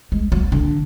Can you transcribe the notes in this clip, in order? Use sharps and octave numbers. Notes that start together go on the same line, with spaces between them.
G#3
F#3
D3